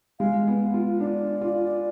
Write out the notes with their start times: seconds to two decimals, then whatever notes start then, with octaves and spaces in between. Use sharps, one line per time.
0.19 G#3 F5
0.47 B3
0.74 F4
1.00 D4 D5
1.41 F4